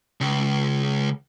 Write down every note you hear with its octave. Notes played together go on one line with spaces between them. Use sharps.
C#2